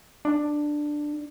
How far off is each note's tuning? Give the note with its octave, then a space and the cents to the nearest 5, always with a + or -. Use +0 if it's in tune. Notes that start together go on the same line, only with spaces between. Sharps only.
D4 +10